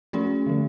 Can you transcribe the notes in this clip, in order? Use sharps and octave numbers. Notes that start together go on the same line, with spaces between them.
F3 A3 C#4 F#4 G#4
D3 F3 A3